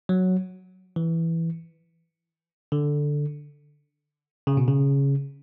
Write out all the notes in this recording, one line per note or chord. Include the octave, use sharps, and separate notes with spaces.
F#3
E3
D3
C#3
B2
C#3